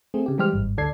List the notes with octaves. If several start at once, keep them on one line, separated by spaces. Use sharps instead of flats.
A3 C4 G#4
C#3 G4
E3 G3 G#3 G4 C5 F6
G#1 G2
D2 D3 A4 D5 G#6 C7